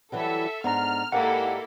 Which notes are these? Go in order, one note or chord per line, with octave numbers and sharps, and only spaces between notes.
E3 F#3 G3 A4 E5
G#2 B3 D4 A#5 F6
G#2 A#3 E4 G4 A4 D5 F#5